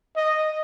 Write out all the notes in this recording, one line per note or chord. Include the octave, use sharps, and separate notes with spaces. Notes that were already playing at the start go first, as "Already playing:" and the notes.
D#5